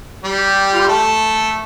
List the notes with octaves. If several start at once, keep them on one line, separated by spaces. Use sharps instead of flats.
G3 G4
F4
G4
A3 A4